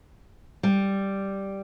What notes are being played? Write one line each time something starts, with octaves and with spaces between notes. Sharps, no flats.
G3